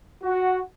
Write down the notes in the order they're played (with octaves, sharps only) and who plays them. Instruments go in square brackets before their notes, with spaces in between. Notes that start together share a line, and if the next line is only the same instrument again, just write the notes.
[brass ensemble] F#4